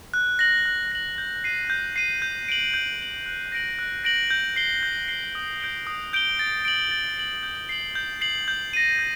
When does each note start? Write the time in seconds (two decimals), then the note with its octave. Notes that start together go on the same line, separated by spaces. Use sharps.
0.14 F#6
0.39 A#6 F#7
0.65 F#6
0.92 A#6 F#7
1.18 G6
1.44 C7 D#7
1.70 G6
1.96 C7 D#7
2.22 G6
2.49 D7 F#7
2.74 G6
3.00 D7 F#7
3.26 F#6
3.52 A#6 D7 F#7
3.79 F#6
4.04 A#6 D7 F#7
4.30 G6
4.56 C7 G7
4.83 G6
5.08 C7 G7
5.35 D#6
5.60 G6 D7 G7
5.87 D#6
6.13 G6 D7 G7
6.39 A6
6.65 D7 F#7
6.91 A6
7.17 D7 F#7
7.43 G6
7.69 C7 F#7
7.95 G6
8.21 C7 F#7
8.48 G6
8.73 A#6 D#7
8.99 G6